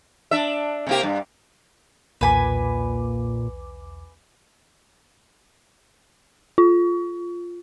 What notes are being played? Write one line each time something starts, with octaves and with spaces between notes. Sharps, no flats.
D4 E5
C3 A#3 G4
G2
B1 E2 A#2 B4 G#5 B5 D6
F4